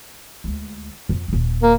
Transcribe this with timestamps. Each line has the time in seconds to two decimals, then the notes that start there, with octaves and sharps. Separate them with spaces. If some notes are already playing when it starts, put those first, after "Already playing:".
0.44 D2 G#3
1.09 F2 D3
1.28 D#1 D#3
1.62 A#3